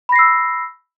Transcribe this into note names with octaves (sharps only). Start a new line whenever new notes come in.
B5 E6 A#6 C7